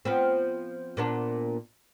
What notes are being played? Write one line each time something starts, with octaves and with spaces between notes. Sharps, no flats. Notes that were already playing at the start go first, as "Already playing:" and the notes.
F3 B3 C4
A#2 B3 D4